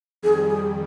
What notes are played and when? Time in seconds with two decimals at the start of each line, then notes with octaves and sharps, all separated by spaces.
0.22 F2 D#3 G3 G#4
0.49 G#4